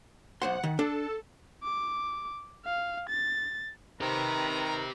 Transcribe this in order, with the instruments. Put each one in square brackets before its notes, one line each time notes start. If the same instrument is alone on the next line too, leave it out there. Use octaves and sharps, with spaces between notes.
[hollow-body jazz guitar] B1 C5 C6 [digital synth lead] F#5
[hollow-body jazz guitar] D#3
[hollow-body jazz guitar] D4 [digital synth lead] A4
[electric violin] D6
F5
A6
[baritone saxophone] D#3 [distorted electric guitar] G4 C5 [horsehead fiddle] B4 [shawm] A#5